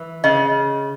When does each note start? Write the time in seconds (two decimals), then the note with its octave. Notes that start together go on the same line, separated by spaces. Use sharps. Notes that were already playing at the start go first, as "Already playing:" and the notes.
Already playing: E3
0.24 C#3 D#5